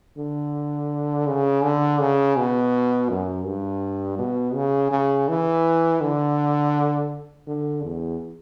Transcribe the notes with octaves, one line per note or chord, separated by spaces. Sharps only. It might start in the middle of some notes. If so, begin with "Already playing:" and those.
D3
C#3
D3
C#3
B2
F#2
G2
B2
C#3
C#3
E3
D3
D3
E2